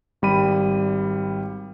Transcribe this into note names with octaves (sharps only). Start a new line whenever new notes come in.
G#1 G3 B5 D#7